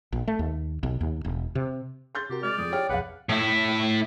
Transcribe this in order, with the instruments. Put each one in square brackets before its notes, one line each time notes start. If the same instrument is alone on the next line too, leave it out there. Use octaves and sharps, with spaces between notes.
[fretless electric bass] A#1
A3
D#2
B1
D#2
E1
C3
[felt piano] C6 G6 A6
[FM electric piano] C3 F#4 A#4 [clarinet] G4
[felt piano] G#3 [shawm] D5 [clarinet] F6
[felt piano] F2 [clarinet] G#4 [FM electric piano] D#6
[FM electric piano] G4 [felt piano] C#5 G5 F6
[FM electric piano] B1 F2 [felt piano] G#4 F5 [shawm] B4 [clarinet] F#5
[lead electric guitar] A2 E4